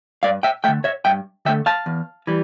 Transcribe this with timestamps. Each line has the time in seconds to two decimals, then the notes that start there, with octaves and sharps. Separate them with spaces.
0.23 G2 D5 F5
0.43 E5 G5
0.64 A3 E5 G5
0.68 D3
0.84 C#5 E5
1.05 G2 E5 G5
1.45 D3 A3 E5 G5
1.66 F5 A5
1.86 E2
2.27 E3 G3